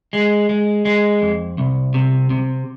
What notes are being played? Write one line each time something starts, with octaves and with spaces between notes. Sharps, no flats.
G#3
G#3
G#3
F2
C2
C3
C3